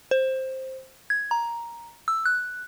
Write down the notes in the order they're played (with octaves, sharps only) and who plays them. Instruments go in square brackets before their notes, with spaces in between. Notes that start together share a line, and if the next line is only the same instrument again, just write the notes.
[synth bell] C5
G#6
A#5
E6
F#6